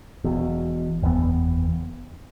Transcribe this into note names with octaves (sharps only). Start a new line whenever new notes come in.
E1 E2 B2
F#1 E2 E3 B3